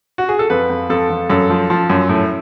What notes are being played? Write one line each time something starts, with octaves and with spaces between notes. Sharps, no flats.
F#4
G#4
A4
F2 B4
F2
F2 A4
F2
F#2 A4
F3
F3
F#2
A2